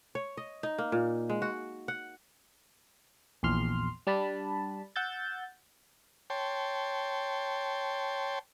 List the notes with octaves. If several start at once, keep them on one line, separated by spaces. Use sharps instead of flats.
C#5
D#5
D#4
A#3
A#2
G#3
F#4
F#5
A#1 E2 C6 F6
G3 D4 A5 B5
F#5 E6 G6 A6
C#5 G5 A5 C6